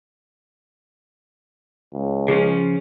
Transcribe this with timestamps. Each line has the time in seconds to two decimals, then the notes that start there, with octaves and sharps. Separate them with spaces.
1.93 C#2
2.28 C#3 F3 C#4 G#4